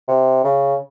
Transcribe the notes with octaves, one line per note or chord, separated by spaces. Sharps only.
C3
C#3